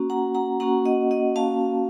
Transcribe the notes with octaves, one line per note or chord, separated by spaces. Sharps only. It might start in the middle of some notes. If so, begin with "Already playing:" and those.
Already playing: A#3 C#4 F#4
F#5 A#5
F#5 A#5
A#3 C#4 F#4 F#5 A#5
D#5 F#5
D#5 F#5
A#3 C#4 F#4 F5 A5